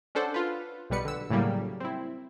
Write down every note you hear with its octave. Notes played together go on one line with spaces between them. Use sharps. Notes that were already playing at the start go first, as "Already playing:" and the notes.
C#4 D4 A4 C5 F#5
F4 B4
B1 B2 G3 B4 C#7
D3 E6
A2 C#3 F#3 G3 A#3
C4 E4